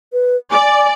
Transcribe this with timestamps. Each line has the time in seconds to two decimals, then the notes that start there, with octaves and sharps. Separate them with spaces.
0.13 B4
0.51 D5 G#5